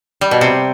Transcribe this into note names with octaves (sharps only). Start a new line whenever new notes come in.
G3
B2
C3